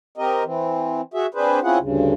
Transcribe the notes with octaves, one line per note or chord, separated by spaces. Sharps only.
C4 G4 A#4 D#5
E3 C4
F#4 G#4 E5
C4 D4 G#4 B4 C5
C4 C#4 E4 F4 G#4 F#5
D2 G2 C#3